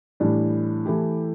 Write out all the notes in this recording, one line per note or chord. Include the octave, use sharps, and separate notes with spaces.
A2 E3 G3 D4
E3 A3 E4 G4